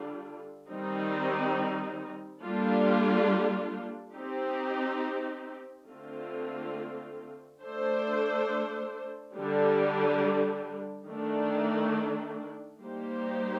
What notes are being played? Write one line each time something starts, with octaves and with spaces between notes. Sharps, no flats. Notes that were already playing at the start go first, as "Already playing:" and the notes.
Already playing: D3 G3 D4 F4
D#3 G3 C4 D#4
G3 A#3 D4 F4 A4
C4 D#4 G4
D3 A3 C4 F4
A3 D4 A4 C5
D3 G3 D4
D#3 A3 D4
G3 A#3 D#4 G4 C5